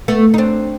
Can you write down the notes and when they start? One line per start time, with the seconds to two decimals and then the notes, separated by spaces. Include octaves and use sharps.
0.08 A3 B3
0.34 D#4
0.38 C4 D4